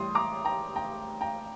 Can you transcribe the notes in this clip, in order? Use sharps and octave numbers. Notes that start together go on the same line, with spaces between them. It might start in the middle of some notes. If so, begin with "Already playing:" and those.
Already playing: A1 A2 G3 C6 D#6
A#5 D6
G5 A#5
G5 A#5
G5 A#5